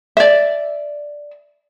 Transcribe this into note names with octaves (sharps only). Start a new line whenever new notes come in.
D5 E5